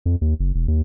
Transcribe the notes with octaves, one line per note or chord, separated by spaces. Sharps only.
F2
D#2
F#1
E1
D#2